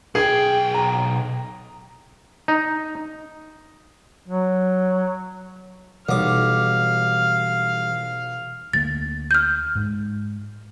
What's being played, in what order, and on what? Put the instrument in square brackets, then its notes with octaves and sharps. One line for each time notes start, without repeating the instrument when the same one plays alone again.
[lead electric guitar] B1 G5 [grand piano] G#4
[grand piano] A#5
[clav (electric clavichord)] D#4
[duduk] F#3
[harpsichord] B1 D6 [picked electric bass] E3 G3 [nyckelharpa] F5
[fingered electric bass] D2 A3 A#3 [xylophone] A6
[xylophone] F6 G6
[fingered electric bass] G#2 G#3